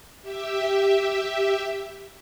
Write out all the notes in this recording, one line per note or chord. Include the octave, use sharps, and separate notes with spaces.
G4 E5